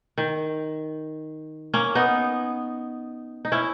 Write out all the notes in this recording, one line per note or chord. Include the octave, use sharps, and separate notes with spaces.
D#3
A#3 C#4
B3 D#4
D#4
C#4 E4